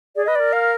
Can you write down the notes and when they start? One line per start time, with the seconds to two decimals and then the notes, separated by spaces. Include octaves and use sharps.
0.16 G#4 D5
0.25 B4 D#5
0.35 A#4 D5
0.53 F5